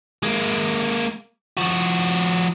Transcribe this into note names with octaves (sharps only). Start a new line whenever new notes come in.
G#3 A#3
F3 F#4